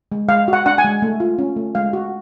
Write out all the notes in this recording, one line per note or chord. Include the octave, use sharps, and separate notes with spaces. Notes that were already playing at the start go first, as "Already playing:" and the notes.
G#3
G#3 F5
F#4 F#5
D4 F#5
G#5
G#3
A3
F4
C#4
A3
G#3 F5
F#4